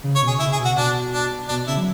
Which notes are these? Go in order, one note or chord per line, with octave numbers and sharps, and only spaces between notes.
C#3
C#5
B2
G#4
C#3 E4
G#4
B2
F#4
B2 D4
D4
B2 D4
C#3 E4
F#3